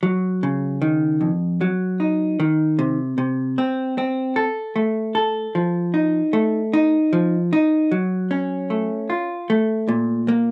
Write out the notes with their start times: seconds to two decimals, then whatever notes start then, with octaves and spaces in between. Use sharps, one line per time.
0.03 F#3
0.43 C#3
0.82 D#3
1.21 F2
1.61 F#3
2.00 D#4
2.40 D#3
2.79 C3
3.18 C3
3.58 C4
3.98 C4
4.36 A4
4.76 A3
5.15 A4
5.55 F3
5.94 D#4
6.33 A3
6.73 D#4
7.13 F3
7.53 D#4
7.91 F#3
8.31 C#4
8.70 A3
9.10 F4
9.50 A3
9.89 A#2
10.28 A#3